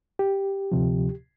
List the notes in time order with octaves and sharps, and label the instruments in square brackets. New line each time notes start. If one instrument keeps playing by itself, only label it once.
[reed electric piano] G4
D2 C3 F3